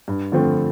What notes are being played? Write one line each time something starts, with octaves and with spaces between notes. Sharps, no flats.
G2
D3 F3 A3 C4